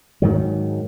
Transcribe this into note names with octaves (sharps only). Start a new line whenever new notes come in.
G#2 D#3 F#3